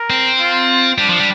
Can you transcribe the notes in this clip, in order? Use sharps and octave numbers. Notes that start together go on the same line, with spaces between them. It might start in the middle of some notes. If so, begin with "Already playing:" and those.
Already playing: A#4
C4
F4
G3 D4
F3
G3